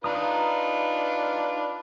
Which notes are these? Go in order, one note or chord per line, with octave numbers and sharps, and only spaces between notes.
D4 D#4 F4 B4 A#5 D#6